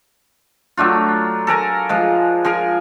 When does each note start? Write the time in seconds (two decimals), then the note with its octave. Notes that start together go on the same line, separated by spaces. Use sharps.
0.77 F#3 A3 D4 F4
1.47 A4 A#4 G#5 A#5
1.89 F3 G#3
2.45 F3 G#4 A#4 G#5